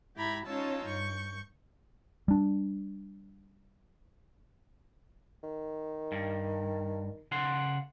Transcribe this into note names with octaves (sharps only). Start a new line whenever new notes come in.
G#2 E4 G4 A#5 B5 G#6
C#4 D#4 F4 C#5 A5 E6
G2 C#6 G6
G3 D4
D#3
G2
C#3 F#5 C6